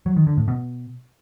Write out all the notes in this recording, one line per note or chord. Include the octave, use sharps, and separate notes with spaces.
F#3
D#3
D3
A2
B2